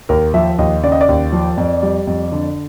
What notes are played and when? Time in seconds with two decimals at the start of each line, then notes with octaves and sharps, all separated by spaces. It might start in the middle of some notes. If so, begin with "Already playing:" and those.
0.09 D#2 A#4
0.34 F3 E5
0.59 D#2 D#5
0.83 C#3 D5
0.92 D#5
1.01 D5
1.09 D#2
1.32 F3
1.57 F2
1.83 G3
2.07 F2
2.32 D3